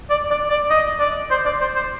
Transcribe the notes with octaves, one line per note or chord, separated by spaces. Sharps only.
D5
D5
D5
D#5
D5
C5
D5
C5
C5